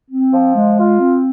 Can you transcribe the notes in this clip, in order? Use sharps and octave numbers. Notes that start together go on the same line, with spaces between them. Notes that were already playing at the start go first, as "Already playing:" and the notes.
C4
F3
G#3
F4
C4